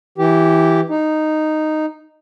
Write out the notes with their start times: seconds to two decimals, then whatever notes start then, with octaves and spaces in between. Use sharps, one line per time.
0.18 E3 G4
0.90 D#4